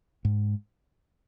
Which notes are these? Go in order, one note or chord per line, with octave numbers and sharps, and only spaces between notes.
G#2